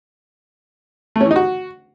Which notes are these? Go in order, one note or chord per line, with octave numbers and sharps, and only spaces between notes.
A3
C#4
E3
D#4
F#4